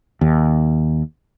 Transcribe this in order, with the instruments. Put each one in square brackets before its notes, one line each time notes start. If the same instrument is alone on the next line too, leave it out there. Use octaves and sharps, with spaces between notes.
[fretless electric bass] D#2